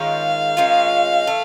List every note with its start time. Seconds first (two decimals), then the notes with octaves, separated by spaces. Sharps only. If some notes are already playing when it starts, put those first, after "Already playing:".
Already playing: D#3 G#3 C#4 F4 F5
0.57 D#3 G#3 C#4 F4
1.27 E3 A3